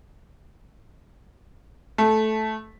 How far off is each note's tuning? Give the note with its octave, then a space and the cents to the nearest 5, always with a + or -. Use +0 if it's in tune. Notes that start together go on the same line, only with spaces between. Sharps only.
A3 -10